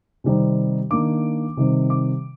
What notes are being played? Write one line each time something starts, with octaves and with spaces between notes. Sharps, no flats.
C3 D#3 G3 C4 D#4
D#3 A#3 D4 D6
C3 D#3 G3 C4
D6